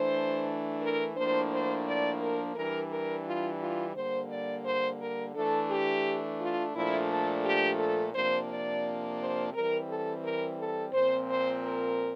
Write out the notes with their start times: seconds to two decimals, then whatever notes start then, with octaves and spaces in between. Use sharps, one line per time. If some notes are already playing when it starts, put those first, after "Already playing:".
Already playing: E3 A3 D4 C5
0.81 A#4
1.16 A2 F3 A#3 D4 C5
1.51 C5
1.86 D5
2.21 A#4
2.55 E3 G3 D4 A#4
2.91 A#4
3.25 F4
3.61 F4
3.95 D3 G3 A#3 C5
4.30 D5
4.65 C5
5.00 A#4
5.35 E3 A3 D4 A4
5.70 G4
6.40 F4
6.74 A#2 F3 A3 D4 E4
7.10 A4
7.45 G4
7.80 A4
8.14 C3 F3 A#3 D4 C5
8.49 D5
9.20 C5
9.54 E3 G3 C4 A#4
9.89 A4
10.24 A#4
10.58 A4
10.93 A#2 F3 C4 C5
11.28 C5
11.63 A#4